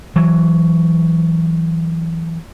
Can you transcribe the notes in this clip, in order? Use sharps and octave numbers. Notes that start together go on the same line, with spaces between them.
E3 F#3